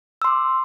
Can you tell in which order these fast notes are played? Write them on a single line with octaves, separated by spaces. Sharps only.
E6 C6 D6